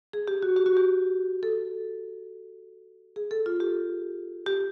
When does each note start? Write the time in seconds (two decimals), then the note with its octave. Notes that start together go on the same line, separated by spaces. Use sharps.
0.13 G#4
0.28 G4
0.43 F#4
0.56 G4
0.66 F#4
0.77 G4
1.43 A4
3.16 G#4
3.31 A4
3.46 F4
3.60 G4
4.46 G4